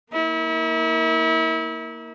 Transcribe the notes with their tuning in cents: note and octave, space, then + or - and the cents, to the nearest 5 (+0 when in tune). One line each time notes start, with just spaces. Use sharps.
A#3 +0 E4 -35